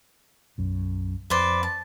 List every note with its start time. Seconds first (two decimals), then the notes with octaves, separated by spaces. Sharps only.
0.58 B1 F#2
1.30 F2 B4 C5 D5
1.63 A5